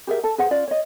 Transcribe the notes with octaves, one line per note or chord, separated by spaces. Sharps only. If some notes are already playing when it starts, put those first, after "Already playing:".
G4 G#4 A#4 E5
A4 A5
G#4 B4 C5 F#5
C#4 F4 D5
C#5 D#5